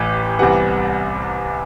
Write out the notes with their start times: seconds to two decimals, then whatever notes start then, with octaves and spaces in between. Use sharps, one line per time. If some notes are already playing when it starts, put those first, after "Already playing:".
Already playing: A1 A2 E3 G4
0.39 C2 C3 E3 G3 B3 F#5